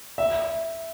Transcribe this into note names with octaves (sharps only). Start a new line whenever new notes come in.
E5